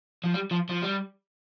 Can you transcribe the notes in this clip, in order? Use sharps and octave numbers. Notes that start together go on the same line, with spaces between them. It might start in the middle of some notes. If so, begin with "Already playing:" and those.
F3
G3
F3
F3
G3